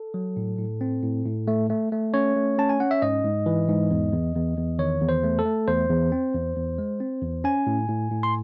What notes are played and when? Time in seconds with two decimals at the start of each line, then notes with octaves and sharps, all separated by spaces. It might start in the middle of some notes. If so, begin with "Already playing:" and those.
Already playing: A4
0.14 F#3
0.37 A2
0.59 A2
0.81 C4
1.03 A2
1.25 A2
1.48 A3
1.70 A3
1.92 A3
2.14 C#4 C#5
2.36 A3
2.58 C#4 A5
2.69 G#5
2.80 C#4 F#5
2.91 E5
3.02 G#2 D#5
3.25 G#2
3.46 E3
3.68 G#2
3.91 E2
4.13 E2
4.35 E2
4.57 E2
4.79 D#3 C#5
5.01 E2
5.09 C5
5.24 A3
5.39 A4
5.45 A3
5.68 E2 C5
5.90 E2
6.12 C4
6.34 E2
6.56 E2
6.78 G#3
7.00 C4
7.22 E2
7.44 C#4 G#5
7.67 A2
7.88 A2
8.11 A2
8.23 C6